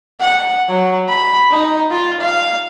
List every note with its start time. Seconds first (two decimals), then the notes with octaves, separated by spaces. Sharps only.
0.20 F#5
0.69 F#3
1.08 B5
1.51 D#4
1.91 F4
2.20 F5